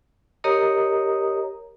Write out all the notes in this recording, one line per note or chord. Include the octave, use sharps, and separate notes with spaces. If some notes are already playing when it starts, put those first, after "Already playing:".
G4 A#4 C#5 D#5 A#5 D#6